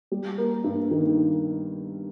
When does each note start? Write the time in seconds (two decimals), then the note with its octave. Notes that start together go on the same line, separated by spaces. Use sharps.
0.12 G3
0.38 A#3
0.64 G2
0.91 D#3